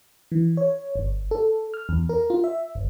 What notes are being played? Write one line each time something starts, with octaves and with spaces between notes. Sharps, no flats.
E3
C#5
G1
A4
F6
E2
A#4
F4
E5
G1